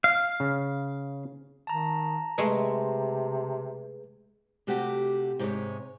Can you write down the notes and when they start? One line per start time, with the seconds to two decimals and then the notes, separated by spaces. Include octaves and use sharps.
0.04 F5
0.40 C#3
1.67 D#3 A5 A#5
2.38 C3 G#3 A3 G#4 B4
4.67 C3 A3 F#4 G4
5.39 G#2 C3 D#4 A#4 C#5